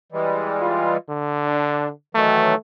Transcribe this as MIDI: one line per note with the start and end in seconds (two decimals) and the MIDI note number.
0.12 0.97 52
0.12 0.97 55
0.12 0.97 56
0.61 0.95 65
1.09 1.90 50
1.45 1.89 62
2.15 2.55 51
2.15 2.55 52
2.15 2.55 54
2.15 2.55 57